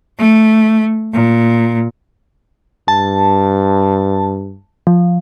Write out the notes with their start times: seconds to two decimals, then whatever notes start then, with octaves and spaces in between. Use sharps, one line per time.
0.18 A3
1.12 A#2
2.88 G2 A5
4.87 F3